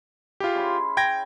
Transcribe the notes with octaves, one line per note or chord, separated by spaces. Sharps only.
E4 F4 G4 G#4
C#4 B5 C6
G5 G#6 A#6